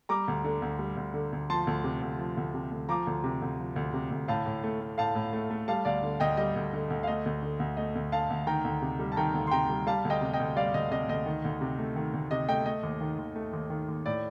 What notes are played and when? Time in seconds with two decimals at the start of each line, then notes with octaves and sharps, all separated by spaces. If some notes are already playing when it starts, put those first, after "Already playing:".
0.09 G3 A#5 D6
0.28 D2
0.44 D3
0.62 D2
0.79 G3
0.97 D2
1.14 D3
1.32 D2
1.50 F3 A5 C6
1.67 D2
1.84 C3
2.02 D2
2.19 F3
2.37 D2
2.54 C3
2.71 D2
2.89 F3 A#5 D6
3.07 D2
3.24 C3
3.42 D2
3.58 F3
3.76 D2
3.94 C3
4.11 D2
4.28 A2 F5 A5
4.46 A2
4.64 A3
4.80 A3
4.98 A2 F5 A5
5.15 A2
5.33 A3
5.50 A3
5.68 G3 F5 A5
5.85 D2 D5 F5
6.03 D3
6.20 D2 D#5 G5
6.37 G3 D#5
6.56 D2
6.73 D3
6.90 D2
7.03 F5
7.07 A3 D#5
7.26 D2
7.42 D3
7.60 D2
7.77 A3 D#5
7.95 D2
8.12 D3 F5 A5
8.30 D2
8.47 D#3 G5 A#5
8.64 D2
8.82 C3
8.99 G3
9.12 A5
9.16 D#3 G5 A#5
9.34 D2
9.47 C6
9.51 C3 G5 A#5
9.69 G3
9.87 G3 F5 A5
10.05 D2
10.10 D#5 G5
10.21 C3
10.33 D#5 G5
10.40 D2
10.56 G3 D5 F5
10.74 D2 D#5
10.91 C3 D#5
11.09 D2 D#5
11.26 D#3
11.44 D2
11.61 C3
11.79 A3
11.96 D#3
12.13 D2
12.31 C3 D#5
12.49 A3 D#5 G5
12.66 A3 D#5
12.83 D#2
13.01 D#3
13.19 D#2
13.36 A3
13.53 D#2
13.70 D#3
13.88 D#2
14.06 A2 D5